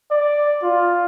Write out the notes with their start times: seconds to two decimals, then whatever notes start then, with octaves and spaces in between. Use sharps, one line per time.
0.11 D5
0.63 F4